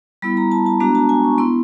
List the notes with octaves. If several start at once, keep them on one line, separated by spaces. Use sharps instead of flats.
G3 B3 E4 B5
A#5
A5
A5
G#3 B3 D4 F#4 A#5
A5
G#5
C#6
B3 E4 C6